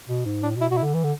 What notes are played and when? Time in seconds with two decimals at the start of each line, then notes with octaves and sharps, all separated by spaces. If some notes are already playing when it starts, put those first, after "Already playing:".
0.08 B2
0.25 G#2
0.43 A2 D4
0.56 B2
0.61 E4
0.70 B2 F#4
0.77 E4
0.82 D3
0.94 E3
1.04 D3